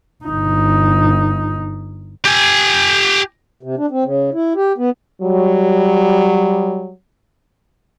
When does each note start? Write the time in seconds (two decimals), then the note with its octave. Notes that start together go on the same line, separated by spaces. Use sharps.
0.25 G1 D#4
2.25 G4 G#5
3.63 C3
3.78 D4
3.91 C4
4.04 C#3
4.34 E4
4.56 G4
4.78 B3
5.21 F#3 G3